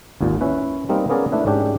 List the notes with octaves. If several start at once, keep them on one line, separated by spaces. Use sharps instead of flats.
G#1 D#2 A#2
C#4 E4 B4
G3 A#3 C4 D#4 A#4
A#3 B3 C#4 G#4 A#4 D5
A3 D4 E4 B4
G#2 C#4 D4 G4